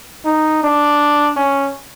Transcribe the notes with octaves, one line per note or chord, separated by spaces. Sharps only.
D#4
D4
C#4